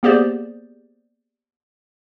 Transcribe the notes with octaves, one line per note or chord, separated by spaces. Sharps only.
A#3 B3 G4 G#4 C5 D5